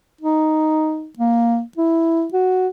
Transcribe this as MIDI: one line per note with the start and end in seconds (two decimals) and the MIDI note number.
0.21 1.08 63
1.19 1.61 58
1.77 2.27 64
2.33 2.68 66